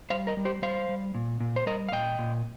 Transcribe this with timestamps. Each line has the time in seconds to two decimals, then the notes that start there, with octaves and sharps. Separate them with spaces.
0.10 G3 C5 F5
0.27 A#4 D#5
0.37 G3
0.45 G4 C5
0.62 G3 C5 F5
0.89 G3
1.14 A#2
1.40 A#2
1.56 C5
1.66 G3 A#4 D#5
1.89 F5
1.92 A#2 D#5 G5
2.18 A#2